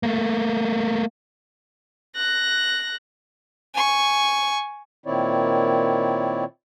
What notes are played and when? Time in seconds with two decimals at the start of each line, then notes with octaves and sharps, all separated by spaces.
0.03 A3 A#3
2.16 F#6 A#6
3.74 G#5 C#6
5.06 A#2 D#3 C4 E4 C#5 D5